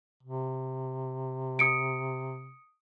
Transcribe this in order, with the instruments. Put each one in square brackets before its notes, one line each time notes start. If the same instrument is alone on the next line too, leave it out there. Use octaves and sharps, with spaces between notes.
[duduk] C3
[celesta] D#6 C#7 D7